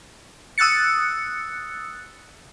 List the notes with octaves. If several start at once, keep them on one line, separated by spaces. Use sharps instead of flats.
D#6 E6 F#6 A6 C#7